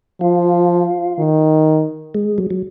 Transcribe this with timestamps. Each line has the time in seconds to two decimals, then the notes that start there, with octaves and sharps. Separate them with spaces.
0.21 F3 F4
1.18 D#3
2.15 G#3
2.38 F#3
2.50 F#3